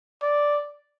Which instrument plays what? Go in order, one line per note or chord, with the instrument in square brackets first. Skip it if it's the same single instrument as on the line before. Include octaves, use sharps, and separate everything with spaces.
[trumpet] D5